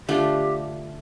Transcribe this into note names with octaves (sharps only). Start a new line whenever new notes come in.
D3 A3 D4 F4 G4